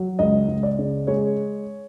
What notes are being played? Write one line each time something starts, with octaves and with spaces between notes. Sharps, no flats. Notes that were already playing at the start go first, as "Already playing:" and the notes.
Already playing: F#3
C#2 D#5
C#2
D5
C#3
G#3 C#5